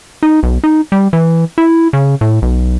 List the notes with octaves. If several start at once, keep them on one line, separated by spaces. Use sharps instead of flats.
D#4
B1
D#4
G3
E3
E4
C#3
A2
B1